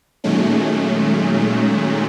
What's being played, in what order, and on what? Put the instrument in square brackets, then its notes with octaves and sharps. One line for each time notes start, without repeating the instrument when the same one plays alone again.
[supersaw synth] A#2 D#3 F#3 G#3 A3 C#4